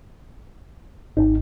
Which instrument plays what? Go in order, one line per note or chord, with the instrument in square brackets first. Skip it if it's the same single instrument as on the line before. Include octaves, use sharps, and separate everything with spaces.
[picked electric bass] G#1 [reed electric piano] D#4